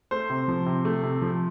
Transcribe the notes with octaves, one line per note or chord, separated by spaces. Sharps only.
A3 C5
C3
F3
C3
A3
C3
F3